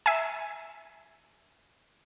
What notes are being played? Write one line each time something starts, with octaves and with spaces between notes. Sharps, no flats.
E5 G#5